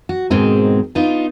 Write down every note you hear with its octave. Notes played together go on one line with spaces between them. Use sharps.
F#4
G#2 B2 D#3 G#3 C4
B3 D4 D#4 F4